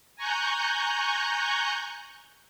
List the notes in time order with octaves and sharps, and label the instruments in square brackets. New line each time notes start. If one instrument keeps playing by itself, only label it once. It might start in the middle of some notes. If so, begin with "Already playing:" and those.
[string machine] G#5 A#5 C#6 F#6 G6